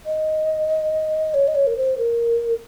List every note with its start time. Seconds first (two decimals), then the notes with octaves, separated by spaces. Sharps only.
0.06 D#5
1.34 C#5
1.48 D#5
1.55 C#5
1.67 A#4
1.77 C5
1.98 A#4